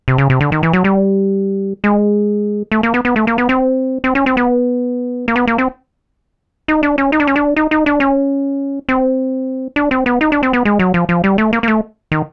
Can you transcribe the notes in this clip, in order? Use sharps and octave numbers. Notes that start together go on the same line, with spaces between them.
C3
C#3
C3
D3
D#3
E3
F#3
G3
G#3
A3
A#3
B3
B3
A3
A#3
B3
C4
C4
C#4
C4
B3
A#3
B3
A#3
C4
D#4
D4
C#4
D#4
D4
C#4
D4
D#4
D#4
D4
C#4
C4
D4
C4
B3
D#4
D4
C4
B3
G#3
F#3
F3
F3
G3
A3
A#3
A#3
A3
D#3